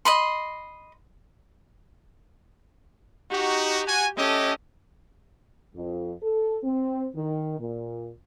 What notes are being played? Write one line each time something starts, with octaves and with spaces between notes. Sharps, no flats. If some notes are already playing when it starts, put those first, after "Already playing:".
D#5 B5 C6
D#4 F#4 G4
F#4 G#5
A3 C#4 G4 A4 D#5
F2
A4
C4
D#3
A#2